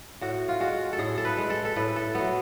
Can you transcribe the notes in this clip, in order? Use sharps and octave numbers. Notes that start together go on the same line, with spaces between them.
A2 F#4
F4
G#3 F#4
A4
A2 G#4
A4
B4
G#3
A4
A4
A2 B4
A4
F#3 A3 B3